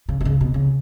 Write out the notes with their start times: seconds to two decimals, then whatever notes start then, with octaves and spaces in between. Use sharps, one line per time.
0.09 C#3
0.21 B2
0.25 C#3
0.41 B2
0.54 C#3